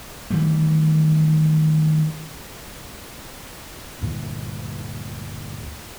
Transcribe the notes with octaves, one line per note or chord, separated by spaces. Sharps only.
D#3 E3 G3 A3
D2 G2 A#2 E3